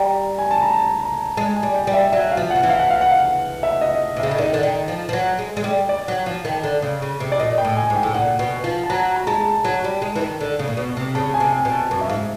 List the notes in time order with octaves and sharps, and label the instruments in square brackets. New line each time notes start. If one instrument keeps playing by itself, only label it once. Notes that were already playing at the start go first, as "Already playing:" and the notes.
Already playing: [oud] G3 [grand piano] A#5
[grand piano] G#5
A5
A#5
A#5
[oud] G#3 [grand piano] A5
[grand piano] G#5
[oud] G3
[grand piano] G5
[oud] G3
[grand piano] E5
[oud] F#3 [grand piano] E5
[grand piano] F5
[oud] F3
[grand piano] F#5
[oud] F3
E3
[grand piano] F5
F#5
F5
F#5
F5
E5
D#5
[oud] C3
[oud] C#3 [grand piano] E5
[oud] D3 [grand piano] D#5
[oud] D#3 [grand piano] D5
[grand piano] D#5
[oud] D3
D#3
F3
F3
F#3
G#3
G#3
G3
[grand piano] D5
[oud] F#3
F3
D#3
D3
C#3
C#3
C3
[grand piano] D5
[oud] A#2 [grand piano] D#5
[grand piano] G5
[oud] A2
[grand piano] G#5
[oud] G#2
[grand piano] G5
[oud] A2
[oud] A#2 [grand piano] F#5
[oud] B2
F3
[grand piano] A5
[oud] F#3 [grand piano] A#5
[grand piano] A#5
[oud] G#3 [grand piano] A5
[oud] F#3
G3
G#3
E3
D#3
D3
C#3
A#2
B2
C3
[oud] C#3 [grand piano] A5
[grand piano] G#5
[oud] C3
[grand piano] G#5
[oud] B2
[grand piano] A5
[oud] F#2
[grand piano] E5
[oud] G#2 [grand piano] F5